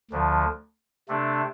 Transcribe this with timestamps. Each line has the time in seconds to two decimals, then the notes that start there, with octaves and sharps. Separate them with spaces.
0.11 D2 D3 F3
1.09 C3 A3 D4